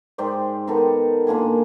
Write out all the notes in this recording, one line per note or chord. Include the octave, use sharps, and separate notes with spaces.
G#2 C5 D5 G5
D#3 B3 A4 A#4
A#2 D3 A#3 G#5